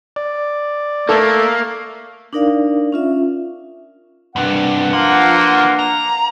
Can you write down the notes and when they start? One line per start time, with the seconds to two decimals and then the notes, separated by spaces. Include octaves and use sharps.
0.16 D5
1.09 A3 A#3 A4
2.33 D4 D#4 A#4 D5 F5
2.92 C#4 F4 E5
4.36 G2 C3 D4 B4 F#5
4.93 F3 A#3
5.79 A#5